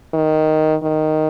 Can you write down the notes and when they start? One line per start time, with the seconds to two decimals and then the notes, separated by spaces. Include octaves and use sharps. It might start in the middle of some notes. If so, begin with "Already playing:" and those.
0.14 D#3
0.82 D#3